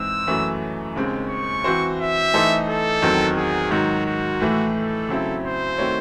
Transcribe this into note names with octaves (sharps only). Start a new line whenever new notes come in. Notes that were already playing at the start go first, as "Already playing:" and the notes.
Already playing: G#2 E3 C4 E6
F#2 E3 A3 C#4 F#4
D#2 C#3 G#3 C4
C#6
E3 C4 F#4 C5
E5
E3 A3 D#4 A4 C5
A4
E2 D#3 F#3 C4
G#4
G#2 D#3 F#3 F#4
F#4
A2 E3 A3
A4
C#3 F#3 C4 E4
C5
D#3 A3 C4 F#4 C#5